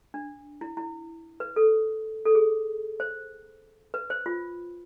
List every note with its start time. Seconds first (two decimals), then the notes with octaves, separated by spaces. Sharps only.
0.14 D4
0.61 E4
0.77 E4
1.40 B4
1.56 A4
2.25 A4
2.35 G#4
3.00 C5
3.94 B4
4.10 C5
4.26 F4